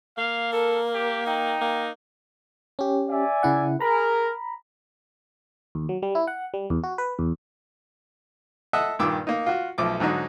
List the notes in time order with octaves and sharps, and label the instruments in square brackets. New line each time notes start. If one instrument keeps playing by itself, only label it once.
[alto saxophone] A#3 [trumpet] F5
[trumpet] A4 [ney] A#4
[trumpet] G4
[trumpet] D#4 [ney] G5
[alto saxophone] A#3
[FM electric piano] C#4 G4
[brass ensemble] D5 E5 G#5
[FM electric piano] C#3 E4 F#5
[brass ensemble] G#4 A#4 [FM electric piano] A#5 B5
[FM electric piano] D#2
F#3
G3
E4
F#5
G3
E2
F#4
B4
E2
[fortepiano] A4 D#5 E5 F#5
G2 A#2 D#3 D6 E6
A#3 D#4
F4 F#4
B1 F3 A3 D6
G#2 D3 F#3 D#4